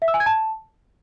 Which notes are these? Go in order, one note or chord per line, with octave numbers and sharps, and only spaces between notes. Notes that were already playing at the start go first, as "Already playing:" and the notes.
E5
E6
G#5
G#6
A5